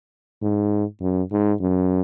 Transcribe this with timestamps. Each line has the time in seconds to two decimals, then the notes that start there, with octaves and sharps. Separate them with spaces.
0.43 G#2
1.01 F#2
1.32 G#2
1.61 F#2